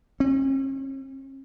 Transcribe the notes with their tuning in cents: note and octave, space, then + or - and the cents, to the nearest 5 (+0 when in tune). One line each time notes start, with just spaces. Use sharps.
C#4 -45